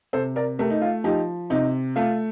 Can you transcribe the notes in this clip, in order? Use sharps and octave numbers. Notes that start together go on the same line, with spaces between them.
C3 A4 C5
A#4 D5
A3 G4 A#4
D#4
F4
F3 D#4 G4
C3 D#4
A3 F4